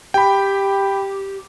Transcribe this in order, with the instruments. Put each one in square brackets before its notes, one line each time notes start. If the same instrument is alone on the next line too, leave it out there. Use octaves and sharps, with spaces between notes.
[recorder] G4 [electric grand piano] G5 B5